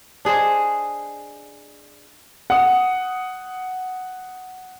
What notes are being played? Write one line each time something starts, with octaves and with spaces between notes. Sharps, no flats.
D4 G#4 C5 D#5
F#5 D#6